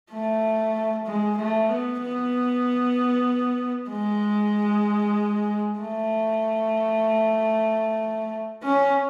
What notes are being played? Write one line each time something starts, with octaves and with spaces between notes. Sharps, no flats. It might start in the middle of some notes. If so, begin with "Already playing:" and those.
A3
G#3
A3
B3
B3
G#3
A3
C#4